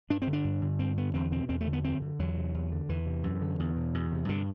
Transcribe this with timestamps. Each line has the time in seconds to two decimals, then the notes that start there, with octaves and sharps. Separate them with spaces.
0.10 G2 D4
0.22 C4
0.27 D3
0.33 D4
0.44 G2
0.61 D3
0.79 G2 C4
0.97 D3 B3
1.14 E2 C4
1.32 B2 C4
1.49 E2 C4
1.61 A3
1.67 D3
1.73 B3
1.84 F#2 C4
2.02 D3
2.19 E2 F#3
2.37 C3
2.54 E2
2.72 D3
2.89 E2 E3
3.06 C3
3.23 F#2
3.41 D3
3.59 E2
3.77 B2
3.94 E2
4.12 C3
4.28 G2 D3